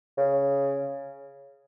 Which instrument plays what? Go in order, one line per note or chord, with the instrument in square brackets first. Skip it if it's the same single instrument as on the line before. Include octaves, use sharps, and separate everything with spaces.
[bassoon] C#3